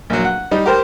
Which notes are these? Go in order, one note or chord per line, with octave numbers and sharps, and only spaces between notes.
A#1 F#3
F#5
G3 D#4
G4 A#4 C5